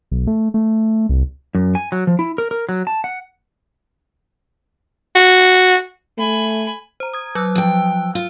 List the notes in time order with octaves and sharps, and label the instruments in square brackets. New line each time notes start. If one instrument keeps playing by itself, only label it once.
[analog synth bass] B1
A3
A3
C2
[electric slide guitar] F#2
G#5
F#3
F3
E4
A#4
A#4
F#3
A5
F#5
[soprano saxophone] F#4
[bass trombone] A3 [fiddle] G#5 B5
[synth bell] C5 A#5
D#6 G#6
F#3 E6 F#6
[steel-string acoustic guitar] F3 G5
F4